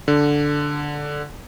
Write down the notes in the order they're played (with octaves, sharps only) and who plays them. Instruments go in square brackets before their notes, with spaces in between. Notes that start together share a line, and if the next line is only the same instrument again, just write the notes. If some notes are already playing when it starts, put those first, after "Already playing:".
[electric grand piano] D3